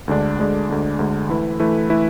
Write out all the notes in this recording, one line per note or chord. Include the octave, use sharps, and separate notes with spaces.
D2 D3 G#3 D4
D2 D3 G#3 D4
D2 D3 G#3 D4
D2 D3 G#3 D4
E3 A3 E4 B4
E3 A3 E4 B4
E3 A3 E4 B4